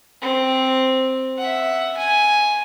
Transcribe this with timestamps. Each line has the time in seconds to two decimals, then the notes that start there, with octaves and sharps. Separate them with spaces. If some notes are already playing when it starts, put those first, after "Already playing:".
0.22 C4
1.38 E5 F#5
1.98 G#5